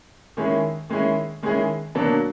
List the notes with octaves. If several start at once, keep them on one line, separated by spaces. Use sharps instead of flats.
D#3 G#3 C#4 E4 G#4
D#3 G#3 C#4 E4 G#4
D#3 G#3 C#4 E4 G#4
B2 F#3 A#3 D4